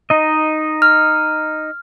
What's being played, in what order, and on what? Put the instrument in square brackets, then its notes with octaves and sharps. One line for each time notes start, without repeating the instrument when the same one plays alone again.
[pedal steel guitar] D#4 D#5
[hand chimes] F6